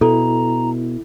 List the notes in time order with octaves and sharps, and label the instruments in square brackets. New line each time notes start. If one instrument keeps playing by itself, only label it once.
[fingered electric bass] B2 [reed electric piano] E4 [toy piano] A4 [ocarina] A#5